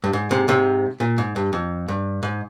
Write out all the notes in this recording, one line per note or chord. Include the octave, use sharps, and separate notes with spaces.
G2
G#2
G#2 C3
G#2 C3
A#2
G#2
G2
F2
G2
G#2